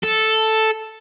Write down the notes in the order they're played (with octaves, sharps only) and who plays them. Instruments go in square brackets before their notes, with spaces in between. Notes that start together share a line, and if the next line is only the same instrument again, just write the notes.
[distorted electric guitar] A4